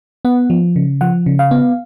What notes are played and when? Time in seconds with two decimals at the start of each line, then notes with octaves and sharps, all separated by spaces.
0.25 B3 F#5
0.50 F3
0.76 C#3
1.01 F3 F#5
1.26 C#3
1.39 F5
1.51 B3